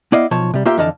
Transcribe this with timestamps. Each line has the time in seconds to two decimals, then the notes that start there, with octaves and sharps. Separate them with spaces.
0.12 B3 E4 D5 D#5 F5
0.31 B1 B2 F3 C#5 A5
0.54 C3 G3
0.65 A#3 F4 G4 E5 G5
0.77 F2 D3 E3 D#5 F5 A5